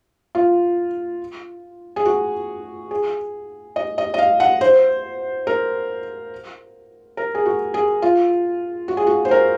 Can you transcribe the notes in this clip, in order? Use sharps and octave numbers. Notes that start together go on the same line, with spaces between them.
F4
G#4
F#4
G#4
D#5
D#5
D#5
F5
F#5
C5
A#4
A#4
G#4
F#4
G#4
F4
F#4
G#4
F#4
C5
A#4